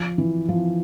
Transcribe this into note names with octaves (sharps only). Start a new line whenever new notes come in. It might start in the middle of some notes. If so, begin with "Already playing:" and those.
Already playing: F3
E3
F3